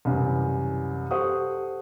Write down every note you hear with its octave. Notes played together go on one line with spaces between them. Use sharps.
C2 F#2 E3
G4 A4 C5 F#5 C#6 D#6